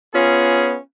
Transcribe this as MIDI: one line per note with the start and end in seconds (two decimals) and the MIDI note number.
0.14 0.77 59
0.14 0.77 61
0.14 0.77 65
0.14 0.77 68